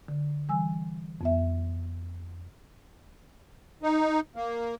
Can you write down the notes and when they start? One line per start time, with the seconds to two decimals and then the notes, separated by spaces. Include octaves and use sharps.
0.08 D3
0.49 E3 G3 G#5 E6
1.21 F2 B3 E5
3.83 D#4
4.36 A#3